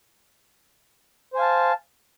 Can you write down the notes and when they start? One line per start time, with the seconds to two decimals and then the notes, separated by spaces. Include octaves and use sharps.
1.34 C5
1.36 G#5
1.39 F5
1.42 A5